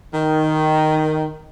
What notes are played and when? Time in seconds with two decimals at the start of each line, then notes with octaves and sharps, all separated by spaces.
0.13 D#3